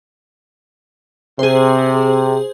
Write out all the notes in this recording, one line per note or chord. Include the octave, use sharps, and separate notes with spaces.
C3 G#4 C5